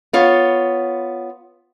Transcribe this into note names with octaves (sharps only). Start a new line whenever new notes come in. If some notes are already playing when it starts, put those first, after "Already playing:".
B3 F4 C#5